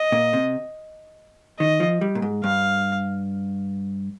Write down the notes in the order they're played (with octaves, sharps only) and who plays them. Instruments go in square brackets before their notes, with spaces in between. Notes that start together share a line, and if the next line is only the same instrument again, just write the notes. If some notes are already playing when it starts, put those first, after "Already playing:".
Already playing: [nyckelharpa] D#5
[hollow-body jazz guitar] A#2
C3
[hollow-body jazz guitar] D#3 [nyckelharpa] D#5
[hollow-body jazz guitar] F3
G3
A#2
G#2
[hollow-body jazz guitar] G2 [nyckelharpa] F5